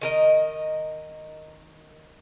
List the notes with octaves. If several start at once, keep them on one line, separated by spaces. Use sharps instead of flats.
D#3 A#4 D#5